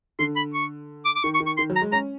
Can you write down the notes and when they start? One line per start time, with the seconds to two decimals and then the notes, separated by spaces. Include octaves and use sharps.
0.19 D3 C6
0.36 B5
0.54 C#6
1.05 D6
1.16 D6
1.24 D#3 C#6
1.34 C#6
1.40 D#3
1.46 C#6
1.57 D#3 C6
1.70 F#3
1.76 A#5
1.81 G#3
1.92 C#4 A#5